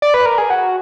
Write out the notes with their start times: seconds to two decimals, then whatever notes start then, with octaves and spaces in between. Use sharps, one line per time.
0.02 D5
0.14 B4
0.26 A#4
0.38 G#4
0.50 F#4